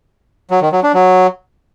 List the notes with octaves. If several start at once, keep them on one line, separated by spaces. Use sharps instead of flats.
F#3
D#3
F#3
D4
F#3